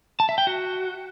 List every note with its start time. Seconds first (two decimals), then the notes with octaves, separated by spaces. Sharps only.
0.20 A5
0.29 E5
0.38 G5
0.47 F#4